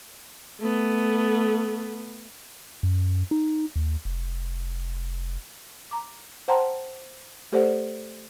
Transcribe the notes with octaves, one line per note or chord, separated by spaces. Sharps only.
A3 B3
F#2
D#4
D#2
F1
A#5 D6
C5 F#5 G5 A5 A#5 C6
A3 G4 A4 C5 D5 F#5